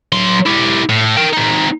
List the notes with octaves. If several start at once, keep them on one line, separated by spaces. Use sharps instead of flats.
F#3 C6
E4 G4
A2
A#4 G5
C4 D#4